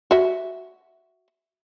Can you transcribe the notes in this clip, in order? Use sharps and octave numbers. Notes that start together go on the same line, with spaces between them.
F#4 E5